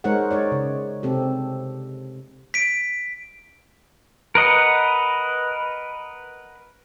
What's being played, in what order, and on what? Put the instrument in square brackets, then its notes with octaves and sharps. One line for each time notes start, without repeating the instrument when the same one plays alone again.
[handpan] G#3 D#4 A#4 C5 C#5 F#5
D#4 C#5 D5
C#3
C3 C4 G4 A4
[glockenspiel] B6 D7
[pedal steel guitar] A#4 B4 D#5 F#5